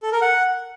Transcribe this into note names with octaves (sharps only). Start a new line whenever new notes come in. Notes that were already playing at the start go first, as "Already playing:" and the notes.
A4
A#4
F#5